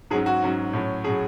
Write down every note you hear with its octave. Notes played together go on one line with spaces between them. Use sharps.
G#2 F#3 C#4 G#4
F#4
G#2 F#3 C#4
A2 F#3 C#4
A2 F#3 C#4 G#4